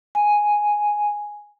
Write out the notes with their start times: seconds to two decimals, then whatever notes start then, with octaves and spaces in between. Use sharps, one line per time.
0.15 G#5